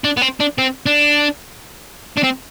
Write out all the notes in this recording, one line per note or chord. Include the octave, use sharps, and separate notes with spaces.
D4
B3
C4
D4
C4
D4
D4
C4